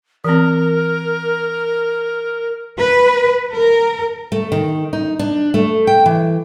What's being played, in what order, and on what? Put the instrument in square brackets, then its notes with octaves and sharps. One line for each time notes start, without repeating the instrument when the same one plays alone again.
[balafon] E3 C4 [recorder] A#4
[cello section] B4
A#4
[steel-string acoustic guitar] A3
D#3
D#4
D4
A3
G5
E3